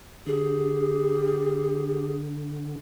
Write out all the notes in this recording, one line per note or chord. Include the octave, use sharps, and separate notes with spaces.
D3 G4 G#4